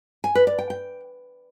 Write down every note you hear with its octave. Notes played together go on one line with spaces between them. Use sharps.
G#5
B4
D5
G5
G5